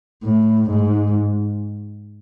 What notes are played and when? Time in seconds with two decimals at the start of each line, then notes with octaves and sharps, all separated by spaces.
0.24 A2
0.71 G#2